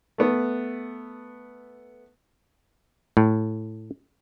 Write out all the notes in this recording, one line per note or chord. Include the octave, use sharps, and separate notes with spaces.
A3 B3
A2